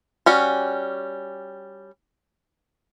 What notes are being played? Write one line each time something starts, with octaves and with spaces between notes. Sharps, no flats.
G3 C#4 F#4